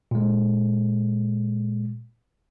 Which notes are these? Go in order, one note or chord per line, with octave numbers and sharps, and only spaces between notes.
A#2 G#3